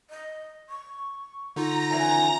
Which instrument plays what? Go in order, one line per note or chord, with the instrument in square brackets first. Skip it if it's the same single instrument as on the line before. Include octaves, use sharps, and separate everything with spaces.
[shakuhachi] D#5
C#6
[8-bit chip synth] D3 D#4 F4 [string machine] A#5 A#6
[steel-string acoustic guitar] C#3 E3 F3 [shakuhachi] G#5